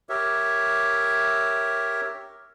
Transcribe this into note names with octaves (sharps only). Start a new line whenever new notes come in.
G4 A#4 C#5 E5